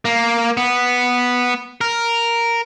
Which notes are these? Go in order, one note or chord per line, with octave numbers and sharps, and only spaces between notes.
A#3
B3
A#4